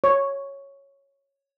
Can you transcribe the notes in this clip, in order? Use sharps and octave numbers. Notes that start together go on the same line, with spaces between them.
C#5